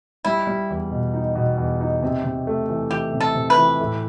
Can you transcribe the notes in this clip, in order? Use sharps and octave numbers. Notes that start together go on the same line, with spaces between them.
G3 E4
G3
E2
B2
D#4
B2
E2
D#4
C3
C3
A3
E3
E3 G4
C3
A4
C3
B4
E3
A2